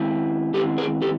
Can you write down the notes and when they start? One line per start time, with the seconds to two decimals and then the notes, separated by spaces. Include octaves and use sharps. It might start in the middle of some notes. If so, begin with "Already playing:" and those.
Already playing: D#3 G#3 C4 E4
0.54 D#3 G#3 C4 E4 G4 A4
0.78 G#4 A#4
1.02 G4 A4